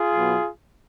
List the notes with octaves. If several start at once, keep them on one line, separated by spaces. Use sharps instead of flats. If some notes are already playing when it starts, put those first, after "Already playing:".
Already playing: F4 G#4
B2 F#3 B3